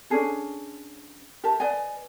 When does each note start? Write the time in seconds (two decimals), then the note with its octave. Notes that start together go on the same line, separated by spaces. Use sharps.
0.10 C#4 D4 G#4 A4
1.44 G4 A#4 E5 A5
1.60 B4 D5 D#5 G#5